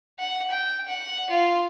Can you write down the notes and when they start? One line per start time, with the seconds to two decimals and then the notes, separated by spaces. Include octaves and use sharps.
0.19 F#5
0.50 G5
0.88 F#5
1.30 F4